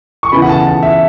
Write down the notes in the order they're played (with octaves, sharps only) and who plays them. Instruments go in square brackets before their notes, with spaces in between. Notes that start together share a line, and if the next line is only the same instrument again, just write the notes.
[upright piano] C#6
C#3 E3 B3 E4 B5
F#5
A5
A5
E5